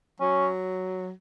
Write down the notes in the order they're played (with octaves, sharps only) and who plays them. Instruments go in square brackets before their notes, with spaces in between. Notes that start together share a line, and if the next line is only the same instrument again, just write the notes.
[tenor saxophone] F#3 [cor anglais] C#4